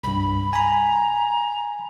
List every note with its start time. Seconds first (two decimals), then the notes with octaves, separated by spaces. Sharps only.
0.03 C2 G2 B5
0.53 G#5 A#5 B5